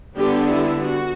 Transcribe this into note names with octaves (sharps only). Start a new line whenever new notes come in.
D3 G3 B3 D4 G4
E4
F#4